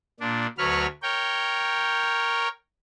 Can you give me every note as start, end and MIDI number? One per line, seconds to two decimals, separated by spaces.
0.20 0.46 46
0.20 0.46 62
0.58 0.86 38
0.58 0.86 54
0.58 0.86 71
0.58 0.86 73
0.58 0.86 89
1.02 2.48 70
1.02 2.48 73
1.02 2.48 79